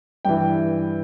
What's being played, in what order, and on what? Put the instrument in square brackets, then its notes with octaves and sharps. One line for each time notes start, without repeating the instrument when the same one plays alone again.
[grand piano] G2 E3 G5